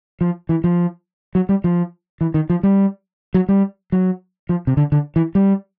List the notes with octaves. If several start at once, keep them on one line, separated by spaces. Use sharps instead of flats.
F3
E3
F3
F#3
G3
F3
E3
D#3
F3
G3
F#3
G3
F#3
F3
C3
D3
D3
E3
G3